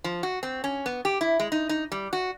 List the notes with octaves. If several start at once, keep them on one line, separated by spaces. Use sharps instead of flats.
F3
F#4
C4
C#4
B3
G4
E4
G#3
D#4
D#4
G3
F#4